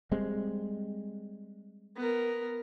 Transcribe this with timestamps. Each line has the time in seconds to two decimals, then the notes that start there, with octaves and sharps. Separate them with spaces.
0.12 G3 G#3 C4
1.96 B3 A#4